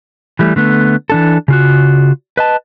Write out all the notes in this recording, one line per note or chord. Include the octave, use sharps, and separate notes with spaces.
E3 G3 A3
D3 A3 B3
E3 D4 A4
C#3 F4 F#4
B4 D#5 A5